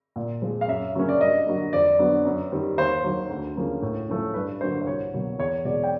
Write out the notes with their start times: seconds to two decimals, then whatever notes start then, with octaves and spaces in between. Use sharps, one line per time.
0.16 A#2
0.42 F3 G#3 C4
0.61 F5
0.68 F#2 E5
0.94 C#3 F#3 A#3 C#4
1.09 D5
1.21 G2 D#5
1.46 D3 F#3 A#3
1.73 F2 D5
1.99 D3 F#3 B3
2.25 F#2
2.52 D#3 G3 C4
2.77 D#2 C5
3.04 D#3 F#3
3.29 D2
3.56 C#3 F3 A#3 C#4
3.82 A2
4.09 F3 A3 C#4
4.34 G2 B4
4.61 D3 F#3 A#3 C5
4.82 C5
4.87 C2 C#5
5.13 B2 F#3 A#3
5.38 E2 C#5
5.65 B2 G#3 C4 D5
5.84 G5